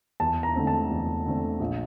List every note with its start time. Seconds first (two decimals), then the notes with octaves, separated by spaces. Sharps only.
0.20 E2 A5
0.43 A#5
0.56 D3 A3 C4
0.67 A5
0.90 E2
1.26 D3 A3 C4
1.60 A#1